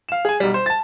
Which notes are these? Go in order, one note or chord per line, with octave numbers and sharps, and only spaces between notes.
F5 E7
G#4 G#5
B1 G3
C5
A5 A6